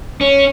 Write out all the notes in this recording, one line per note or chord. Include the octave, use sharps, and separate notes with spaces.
C#4